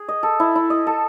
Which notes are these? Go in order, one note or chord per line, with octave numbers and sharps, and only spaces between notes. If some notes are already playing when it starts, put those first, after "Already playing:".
Already playing: G#4
D#5
A4
E4
E4
D#5
A4